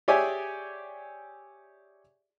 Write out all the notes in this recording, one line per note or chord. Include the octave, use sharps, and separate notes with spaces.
G4 G#4 C#5 D5 E5 G#5